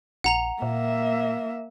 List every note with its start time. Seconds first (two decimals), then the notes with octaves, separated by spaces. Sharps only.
0.24 A#1 F#5 A#5 F7
0.62 A#2 A#3 E5